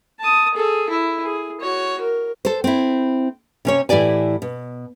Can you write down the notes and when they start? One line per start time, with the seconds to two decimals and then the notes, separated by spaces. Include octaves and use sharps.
0.20 A5 D#6
0.54 G#4 A4
0.89 E4
1.24 G#4
1.61 F#4 C#5
2.01 A#4
2.45 A4 C5
2.64 C4 E4
3.65 C3 C#4 C#5
3.89 A2 E3 E4 G4 D5 G#5
4.42 B2